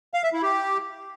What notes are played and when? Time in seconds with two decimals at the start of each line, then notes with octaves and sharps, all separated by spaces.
0.14 F5
0.23 E5
0.33 E4
0.42 G4